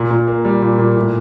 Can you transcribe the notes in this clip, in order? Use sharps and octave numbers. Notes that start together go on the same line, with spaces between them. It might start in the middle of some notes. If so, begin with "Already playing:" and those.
Already playing: A#2
A#2
A#3
G3
A#2
A#2
A2